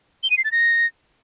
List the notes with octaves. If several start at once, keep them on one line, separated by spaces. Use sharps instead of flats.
G7
D#7
C7
A6
A#6